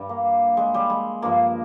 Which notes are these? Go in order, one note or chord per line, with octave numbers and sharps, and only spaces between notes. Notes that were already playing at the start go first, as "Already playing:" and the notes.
Already playing: G2 G3
A#3
G#3
G3
G#3
G2 F3 A#3